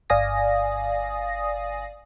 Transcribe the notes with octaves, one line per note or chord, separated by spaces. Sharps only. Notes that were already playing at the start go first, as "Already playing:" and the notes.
G1 D5 F5 G#5 D#6 A#6